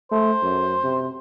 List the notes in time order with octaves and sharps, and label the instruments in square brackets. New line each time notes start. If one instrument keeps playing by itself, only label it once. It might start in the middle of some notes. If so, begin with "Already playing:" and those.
[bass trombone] A3 [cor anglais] C5
[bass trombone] F#2
C3